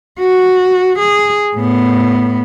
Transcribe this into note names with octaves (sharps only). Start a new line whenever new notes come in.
F#4
G#4
A2 B3